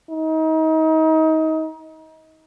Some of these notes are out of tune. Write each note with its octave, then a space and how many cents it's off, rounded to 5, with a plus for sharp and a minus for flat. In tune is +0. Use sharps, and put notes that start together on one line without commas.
D#4 +30